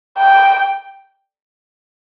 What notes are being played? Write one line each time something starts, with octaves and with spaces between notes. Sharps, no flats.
G5